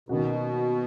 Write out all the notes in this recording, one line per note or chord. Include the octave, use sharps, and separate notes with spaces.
B2 D#3 A#3 C#4 F#4